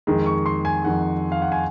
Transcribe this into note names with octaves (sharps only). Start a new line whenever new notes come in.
F2 D#3 G#3
C#6
C6
G#5
F2 D#3 G#3 F#5
F5
F#5
G#5